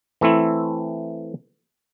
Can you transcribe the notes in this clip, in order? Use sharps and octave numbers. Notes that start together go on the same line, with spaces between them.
E3 A3 C4 E4